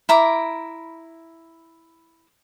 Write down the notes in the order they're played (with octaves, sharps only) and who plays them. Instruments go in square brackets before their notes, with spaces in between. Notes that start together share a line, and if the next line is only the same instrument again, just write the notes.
[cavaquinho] E4 A#5 D6